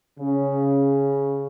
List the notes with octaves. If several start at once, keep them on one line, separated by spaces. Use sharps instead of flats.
C#3